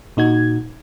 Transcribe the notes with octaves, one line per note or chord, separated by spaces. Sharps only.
A#2 D#4 F#4 G#6